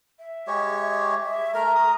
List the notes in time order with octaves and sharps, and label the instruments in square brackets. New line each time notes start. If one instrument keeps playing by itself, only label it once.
[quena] E5
[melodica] G#3 G4 C#5
[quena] E5
[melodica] A3 A#4 [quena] A#5
[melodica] D#6